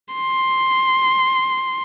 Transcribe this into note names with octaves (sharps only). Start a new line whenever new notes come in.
C6